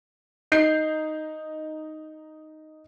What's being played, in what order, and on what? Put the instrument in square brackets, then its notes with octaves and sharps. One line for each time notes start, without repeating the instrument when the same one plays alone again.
[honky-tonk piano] D#4 G6 C7